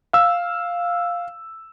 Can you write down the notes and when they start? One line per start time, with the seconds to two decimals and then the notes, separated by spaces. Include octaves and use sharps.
0.13 F5 E6